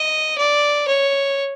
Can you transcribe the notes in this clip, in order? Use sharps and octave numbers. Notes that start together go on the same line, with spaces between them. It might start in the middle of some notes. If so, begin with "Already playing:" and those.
Already playing: D#5
D5
C#5